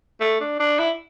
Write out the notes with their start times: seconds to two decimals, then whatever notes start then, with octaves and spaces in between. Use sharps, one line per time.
0.21 A3
0.41 D4
0.60 D4
0.79 E4